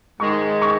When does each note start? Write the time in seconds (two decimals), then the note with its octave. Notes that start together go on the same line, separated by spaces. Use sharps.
0.20 G#2 D#3 G#3 C#6
0.62 C#6